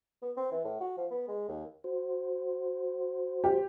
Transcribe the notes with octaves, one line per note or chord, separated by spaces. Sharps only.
B3
C4
E3
A2
F#4
F3
B3
G#3
D#2
F#4 C5
G4